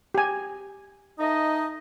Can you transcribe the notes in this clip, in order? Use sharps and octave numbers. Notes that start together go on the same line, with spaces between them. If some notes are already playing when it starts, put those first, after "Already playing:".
G4 G#5
A3 D#4 D#5